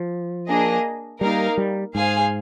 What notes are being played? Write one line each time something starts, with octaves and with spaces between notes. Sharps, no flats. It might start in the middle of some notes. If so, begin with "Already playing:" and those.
Already playing: F3
A#3 D4 G#4 D#5
G3 A#3 D#4 A#4 F5
G3
G#2 G#4 C5 F5 G#5